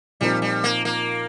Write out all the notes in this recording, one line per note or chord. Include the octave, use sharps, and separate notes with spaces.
A#2 F3 G3 C4 D#4 A#4
G3
A#3
A#3